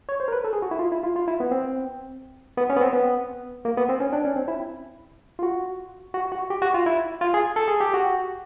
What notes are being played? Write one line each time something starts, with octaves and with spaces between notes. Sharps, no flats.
C#5
C5
A#4
B4
A4
G#4
F#4
E4
F4
E4
F4
F4
E4
B3
C4
B3
C#4
B3
C4
B3
A#3
B3
C4
C#4
D4
C#4
C4
E4
F4
F#4
F#4
F#4
G4
F#4
F4
E4
F4
G#4
A4
G#4
G4
F#4